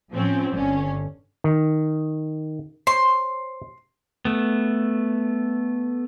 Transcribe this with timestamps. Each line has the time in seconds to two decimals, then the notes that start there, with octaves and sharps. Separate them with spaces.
0.11 A2 F3 C4 C#4
0.53 G1 D3 C#4
1.44 D#3
2.87 C5 C#5 C6
4.25 A3 B3